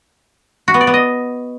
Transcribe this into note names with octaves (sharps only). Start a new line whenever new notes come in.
F#4
B3
D5
B3
D#5